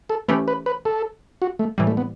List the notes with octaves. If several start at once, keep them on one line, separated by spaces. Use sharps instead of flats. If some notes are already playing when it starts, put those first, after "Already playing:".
A4
E3 A3 C#4 G4 B4
B4
B4
A4
F#4
A3
A2 E3 G3
A3
B3